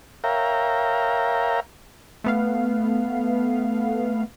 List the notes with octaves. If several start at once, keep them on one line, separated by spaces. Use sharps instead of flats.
A#4 C#5 E5 F5 G5 A#5
A3 B3 F5